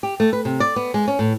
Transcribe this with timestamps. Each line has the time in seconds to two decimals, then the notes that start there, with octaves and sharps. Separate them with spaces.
0.03 G4
0.20 A3
0.33 B4
0.45 C3
0.60 D5
0.76 B3
0.94 G#3
1.08 C#4
1.19 A2